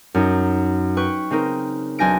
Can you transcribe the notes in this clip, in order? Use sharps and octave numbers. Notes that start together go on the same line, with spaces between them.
F#2 C#4 D#4
B4 G5 C#6
C#3 C4 D#4 A#4
B1 D4 G#5 G6 A#6 D7